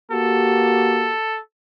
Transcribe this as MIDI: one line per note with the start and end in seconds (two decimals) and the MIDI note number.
0.12 1.15 58
0.12 1.15 66
0.12 1.15 67
0.12 1.40 69